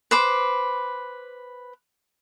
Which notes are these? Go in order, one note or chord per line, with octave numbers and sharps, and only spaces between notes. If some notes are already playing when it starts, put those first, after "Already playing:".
B4 C5 D6